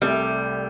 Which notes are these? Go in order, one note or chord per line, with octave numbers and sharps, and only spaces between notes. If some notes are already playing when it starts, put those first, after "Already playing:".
C2 C3 G3 A3